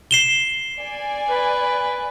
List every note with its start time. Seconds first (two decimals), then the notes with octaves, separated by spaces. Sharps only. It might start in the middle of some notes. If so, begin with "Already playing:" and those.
0.11 C7 E7 G7
0.80 D5 G#5
1.29 B4